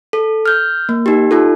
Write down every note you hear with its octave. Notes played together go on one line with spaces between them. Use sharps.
A4
F6 G6
A#3
D#4 G4
D#4 F4 A4